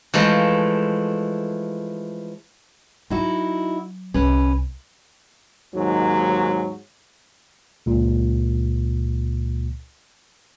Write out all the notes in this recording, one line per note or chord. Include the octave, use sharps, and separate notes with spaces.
E3 F3 G#3 A3
F#3 D#4 E4 F#4
C2 C#4 B4
D#2 G#2 F#3
C#2 A#2